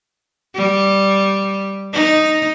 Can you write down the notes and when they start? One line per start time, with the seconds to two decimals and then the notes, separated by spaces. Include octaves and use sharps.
0.55 G3
1.93 D#4